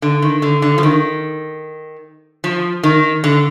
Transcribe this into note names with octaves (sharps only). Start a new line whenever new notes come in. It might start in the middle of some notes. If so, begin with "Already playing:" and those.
D3
D#3
D3
D3
F3
D#3
F3
D#3
D3